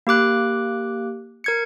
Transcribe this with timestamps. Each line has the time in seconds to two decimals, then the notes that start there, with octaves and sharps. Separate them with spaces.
0.07 A#3 G4 D6 F#6
1.44 A#4 G#6 C#7